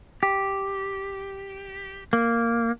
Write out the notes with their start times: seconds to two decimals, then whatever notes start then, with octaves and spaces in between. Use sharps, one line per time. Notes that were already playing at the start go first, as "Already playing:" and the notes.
0.23 G4
2.13 A#3